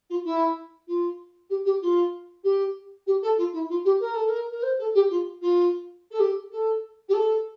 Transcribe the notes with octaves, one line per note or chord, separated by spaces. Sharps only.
F4
E4
F4
G4
G4
F4
G4
G4
A4
F4
E4
F4
G4
A#4
A4
A#4
A#4
C5
A4
G4
F4
F4
A4
G4
A4
G4
A4